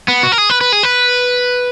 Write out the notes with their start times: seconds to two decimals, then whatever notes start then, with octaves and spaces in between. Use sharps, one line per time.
0.08 B3
0.23 F#4
0.32 A#4
0.38 G#4
0.50 B4
0.61 B4
0.72 G#4
0.83 B4